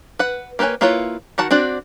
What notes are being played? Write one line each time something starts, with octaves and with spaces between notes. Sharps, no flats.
B4 F#5
A#3 G4 B4 C#5 G#5
A#3 E4 F4 B4 C#5
D#3 F#4 F#5 A5
C4 D4 F#4 D5